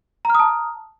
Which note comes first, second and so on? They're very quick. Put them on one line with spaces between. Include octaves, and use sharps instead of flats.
A#5 F6 D#6 A5